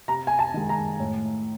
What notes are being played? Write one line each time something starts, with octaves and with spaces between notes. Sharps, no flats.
C3 A#5
G#5
A5
D#3 G#3
A#5
A2